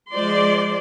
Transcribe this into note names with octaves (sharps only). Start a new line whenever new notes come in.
F3 G#3 C5 D5 C6